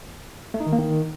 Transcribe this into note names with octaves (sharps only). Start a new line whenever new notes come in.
A3
D#4
D#3
A#3
D#3